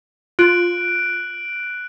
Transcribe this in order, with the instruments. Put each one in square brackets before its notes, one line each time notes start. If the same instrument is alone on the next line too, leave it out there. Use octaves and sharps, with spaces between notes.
[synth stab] F4 [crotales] F#6 D7 F#7